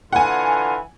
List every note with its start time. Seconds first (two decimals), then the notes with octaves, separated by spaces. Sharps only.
0.13 D3 E3 F4 F#5 G#5